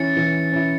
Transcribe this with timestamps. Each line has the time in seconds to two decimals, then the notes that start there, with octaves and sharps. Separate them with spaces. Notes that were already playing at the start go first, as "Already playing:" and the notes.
Already playing: E3 C#4 E4 A6 C#7
0.17 E3
0.52 C#4 E4